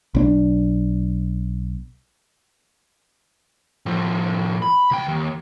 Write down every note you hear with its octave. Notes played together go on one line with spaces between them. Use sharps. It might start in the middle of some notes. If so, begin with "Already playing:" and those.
B1 C4 D4
A2 F3
B5
C#2 G5
D#2